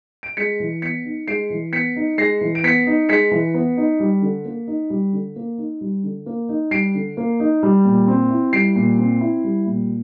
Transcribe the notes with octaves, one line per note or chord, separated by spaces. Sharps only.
D7
G#3 B6 C#7
E3
B3 B6 C#7
D#4
G#3 C7 D7
E3
B3 B6 C#7
D#4
G#3 A#6 C7
E3
D7
B3 B6 C#7
D#4
G#3 B6 C#7
E3
B3
D#4
G3
D3
A#3
D#4
G3
D3
A#3
D#4
G3
D3
A#3
D#4
G3 C7 D7
D3
A#3
D#4
G3
A#2
C4
E4
G3 C7 D7
A#2
C4
E4
G3
A#2